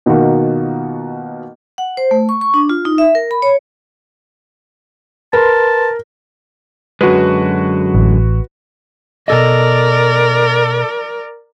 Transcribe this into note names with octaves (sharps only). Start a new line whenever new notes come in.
B2 D#3 A#3 F4 F#4
F#5
C5
A3
C#6
C#6
D4
F4
D#4
E5
A#4
B5
C#5
A#4 B4 A5 C6
F#2 D3 G#3 F#4 B4
A1
B2 A4 A#4 D5 D#5